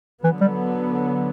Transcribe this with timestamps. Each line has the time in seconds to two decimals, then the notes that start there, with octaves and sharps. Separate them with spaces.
0.24 D3 E3 F#3 B3
0.41 G3